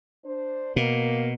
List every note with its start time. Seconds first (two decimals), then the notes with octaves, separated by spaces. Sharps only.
0.24 D4 C5
0.76 B2 A#3